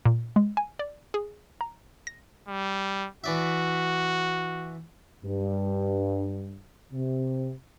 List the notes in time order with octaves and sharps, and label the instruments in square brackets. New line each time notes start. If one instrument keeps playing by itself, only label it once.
[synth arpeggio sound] A#2
G#3
G#5
D5
G#4
A#5
A#6
[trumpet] G3
[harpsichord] E3 D5 E5 [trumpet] F#4
[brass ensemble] G2
C3